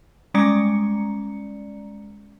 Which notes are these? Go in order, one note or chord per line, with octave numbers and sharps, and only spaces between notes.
G3 G#3 C#4 D5 A#5 C#7